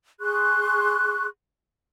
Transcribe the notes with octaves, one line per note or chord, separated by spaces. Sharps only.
G#4 C6 C#6 F#6